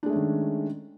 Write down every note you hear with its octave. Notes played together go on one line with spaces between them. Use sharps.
D#3 G#3 A3 C#4 D4